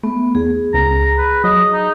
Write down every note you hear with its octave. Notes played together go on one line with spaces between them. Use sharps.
A3 B3
E2 G#4
C#2 A#5
B4
F#3 D#5
D#4